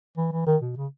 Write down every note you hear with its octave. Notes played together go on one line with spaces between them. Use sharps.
E3
E3
D#3
B2
C#3